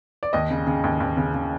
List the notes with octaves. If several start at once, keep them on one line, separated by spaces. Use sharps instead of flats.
D5
D#2 D#5
C#3
C#3
D#2
D#2
C#3
C#3